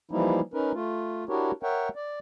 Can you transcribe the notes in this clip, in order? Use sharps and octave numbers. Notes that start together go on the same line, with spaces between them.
E3 F3 G3 A#3 D#4 E4
C#4 D#4 A#4 B4
A3 F4
D4 E4 F#4 G4 A#4 C#5
A#4 C#5 E5 F#5 G5
D5